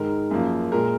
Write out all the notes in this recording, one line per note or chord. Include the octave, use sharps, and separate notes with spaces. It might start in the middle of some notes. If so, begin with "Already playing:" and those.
Already playing: G#2 D#3 G#3 A#4
F#2 C#3 F3 A#3
A#2 G#3 A#4